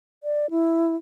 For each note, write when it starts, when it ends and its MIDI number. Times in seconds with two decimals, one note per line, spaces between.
0.23 0.50 74
0.50 0.96 64